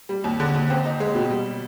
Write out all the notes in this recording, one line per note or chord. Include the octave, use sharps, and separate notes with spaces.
G3
D#2
D3
D#2
C4
D#4
G#3
B2
G3